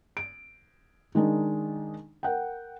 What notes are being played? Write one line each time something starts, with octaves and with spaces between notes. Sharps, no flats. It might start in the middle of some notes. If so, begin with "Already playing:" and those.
D7
D#3 G#3 D4 D#4
A#4 F#5 G5